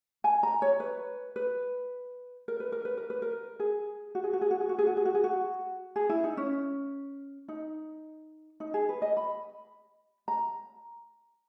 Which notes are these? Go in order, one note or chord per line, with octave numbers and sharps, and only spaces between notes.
G#5
A#5
C#5
B4
B4
A#4
B4
A#4
B4
A#4
B4
A#4
G#4
F#4
G#4
F#4
G#4
F#4
G#4
F#4
G#4
F#4
G#4
F#4
G#4
F#4
G#4
E4
D#4
C#4
D#4
D#4
G#4
B4
D#5
B5
A#5